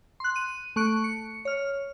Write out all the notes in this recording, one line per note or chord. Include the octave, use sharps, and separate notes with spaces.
C6 F#6
D#7
A3 C#6 F#6 D7
C#7
C#5 F6